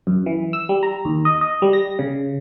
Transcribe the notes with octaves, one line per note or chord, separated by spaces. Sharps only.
F#2
E3
E6
G3
A#5
D#2
D#5
D#5
G3
A#6
C#3